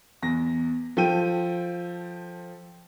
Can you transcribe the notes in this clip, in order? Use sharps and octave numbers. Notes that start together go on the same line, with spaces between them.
E2 A#6
F3 A4 G5 D#7